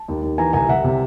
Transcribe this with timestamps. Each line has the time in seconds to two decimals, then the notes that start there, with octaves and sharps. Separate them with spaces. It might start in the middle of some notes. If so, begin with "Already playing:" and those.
Already playing: A5
0.08 D#2
0.23 D#2
0.38 E3 G#5 A#5
0.53 C2 G#5 A#5
0.68 C2 E5 F#5
0.84 C3